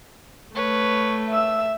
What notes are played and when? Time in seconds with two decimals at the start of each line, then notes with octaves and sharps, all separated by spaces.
0.55 A3 B4 C#5
1.30 E5 E6